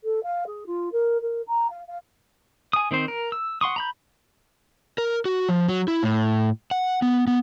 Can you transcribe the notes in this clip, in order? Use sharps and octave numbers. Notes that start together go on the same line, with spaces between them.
A4
F5
G#4
F4
A#4
A#4
A#5
F5
F5
G#5 D#6
D#3 C4 D#4 C5
A#4
E6
F#5 C6 C#6 D#6
A#5 B5 G6
A#4
F#4
F3
F#3
E4
A2
F#5
B3
B3